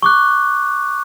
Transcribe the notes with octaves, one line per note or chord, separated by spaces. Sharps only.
C#6 D6 F#6